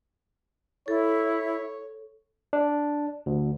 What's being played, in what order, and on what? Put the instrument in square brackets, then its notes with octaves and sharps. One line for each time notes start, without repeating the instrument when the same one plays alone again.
[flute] E4 [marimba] A4 [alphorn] C#5
[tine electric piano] D4
D2